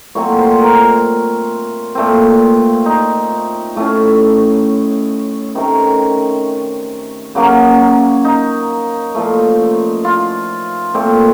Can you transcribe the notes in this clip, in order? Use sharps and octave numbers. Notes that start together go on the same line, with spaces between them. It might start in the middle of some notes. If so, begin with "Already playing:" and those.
A#2 F#3 A3 C4 C#5
C5
A#4
A#2 A3 C4
D#4
A2 A3 C#4
C3 D#3 A3 C#4
C#3 F#3 A#3 C#4
D#4
A#2 F3 A3
F4
A#2 A3 C4